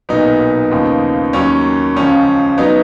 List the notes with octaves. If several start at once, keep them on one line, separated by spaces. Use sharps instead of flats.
B1 A#2 F#3 B3 D#4
D#2 C#3 F3
D#2 D#3 F#3 C#4
C#2 C#3 F3 C#4
F#3 B3 D#4